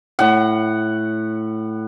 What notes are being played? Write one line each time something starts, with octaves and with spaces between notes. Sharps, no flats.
A2 F#5